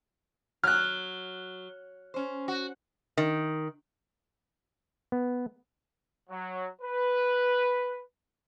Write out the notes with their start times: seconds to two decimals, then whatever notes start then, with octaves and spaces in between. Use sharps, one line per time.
0.64 F#3 F6 F#6
2.14 C#4 C5
2.48 F#4
3.17 D#3
5.12 B3
6.30 F#3
6.82 B4